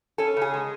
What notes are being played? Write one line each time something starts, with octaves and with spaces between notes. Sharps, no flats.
C#4 A4
C#3 G#4
G#3